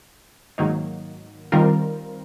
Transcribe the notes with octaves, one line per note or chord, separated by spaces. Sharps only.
G#2 D#3 F#3 A#3 D#4
D#3 G3 C4 F4 A#4